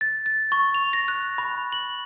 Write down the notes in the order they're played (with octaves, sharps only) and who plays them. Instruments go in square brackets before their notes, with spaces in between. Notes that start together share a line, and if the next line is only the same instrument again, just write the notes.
[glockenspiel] A6
A6
C#6
F7
A#6
F#6
B5
F#7